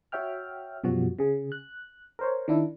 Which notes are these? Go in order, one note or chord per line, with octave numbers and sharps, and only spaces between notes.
F#4 C#5 E5 G5 F6
F#2 B2 F3 G3 F#4
C#3 G#4
F#6
A#4 C5 C#5
D#3 D4 E4